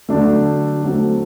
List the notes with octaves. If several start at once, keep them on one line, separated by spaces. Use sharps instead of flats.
D3 F#3 A3 D4
F#3 A3 C4